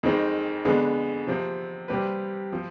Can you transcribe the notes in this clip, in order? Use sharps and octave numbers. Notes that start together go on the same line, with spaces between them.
F2 D#3 G#3 C4 D#4
F2 D3 G#3 B3
C3 F3 C4
C3 G3 C4 G4 B4
F3 C4